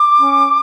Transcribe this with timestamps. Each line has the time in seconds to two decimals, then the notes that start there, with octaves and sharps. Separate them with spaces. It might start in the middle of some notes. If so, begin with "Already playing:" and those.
Already playing: D6
0.20 C#4